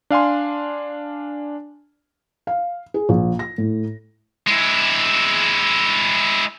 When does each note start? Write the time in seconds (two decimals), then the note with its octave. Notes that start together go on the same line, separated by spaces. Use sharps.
0.10 D4 F5 G#5 C6
2.47 F5
2.94 G#4
3.09 A#1
3.39 A#6
3.58 A2
4.48 G#3 E4